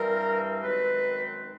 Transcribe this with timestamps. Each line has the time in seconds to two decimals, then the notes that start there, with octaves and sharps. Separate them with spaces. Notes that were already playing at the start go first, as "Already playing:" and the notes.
Already playing: G2 E3 G3 C4 A#4
0.62 F#2 D#3 G#3 C4 B4